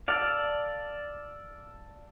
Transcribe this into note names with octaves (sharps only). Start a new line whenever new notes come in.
A4 D5 F5